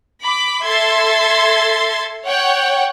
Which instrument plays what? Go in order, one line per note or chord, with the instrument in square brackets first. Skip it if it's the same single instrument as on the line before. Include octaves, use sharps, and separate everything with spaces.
[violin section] B5 D6
A4 E5 C6 G#6 A6
C#5 F#5 G5